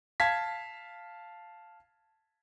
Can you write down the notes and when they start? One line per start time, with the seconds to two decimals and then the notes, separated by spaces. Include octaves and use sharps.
0.20 F5 A5 G#6 B6